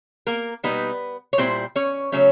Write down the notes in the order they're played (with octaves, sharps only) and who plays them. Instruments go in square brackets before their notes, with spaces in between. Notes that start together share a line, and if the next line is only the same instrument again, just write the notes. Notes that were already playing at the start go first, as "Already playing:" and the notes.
[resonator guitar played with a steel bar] A#3 A#4
B2 G3 A#3 B3 D#4 B4
C#5
A#2 G3 C4 E4 C5
C#4 C#5
C#3 F#3 A3 C#4